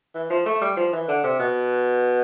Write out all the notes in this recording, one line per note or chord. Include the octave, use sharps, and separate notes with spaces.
E3
F3
A3
G3
F3
E3
D3
C3
B2